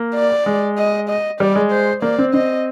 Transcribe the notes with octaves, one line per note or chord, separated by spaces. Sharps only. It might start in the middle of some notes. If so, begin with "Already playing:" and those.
Already playing: A#3
D5
G#3
D#5
D#5
G3 D5
G#3
C5
A#3 D5
C4
C4 D#5